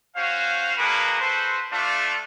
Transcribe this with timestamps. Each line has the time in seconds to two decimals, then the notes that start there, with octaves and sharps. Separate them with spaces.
0.16 C#4 F#4 C5 F5
0.78 A#3 D4 F#4 G#4 A#4 B4
1.20 F#4 A4 B4 C5
1.71 A3 D4 F4